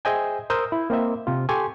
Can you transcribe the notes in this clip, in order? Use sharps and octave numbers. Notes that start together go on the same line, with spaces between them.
G#4 C5 D#5 E5 G5 G#5
A#4 C5 D#6 E6 G6
E4
A#3 C4 D#5 E5
C3 F4
G4 A4 G#5 C6 C#6